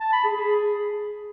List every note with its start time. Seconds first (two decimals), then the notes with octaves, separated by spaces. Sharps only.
0.01 A5
0.12 B5
0.24 G#4
0.36 G#4